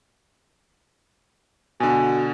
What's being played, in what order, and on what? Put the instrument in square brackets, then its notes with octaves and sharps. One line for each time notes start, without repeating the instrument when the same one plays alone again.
[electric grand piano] B2 D3 [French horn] F#4 [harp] G#5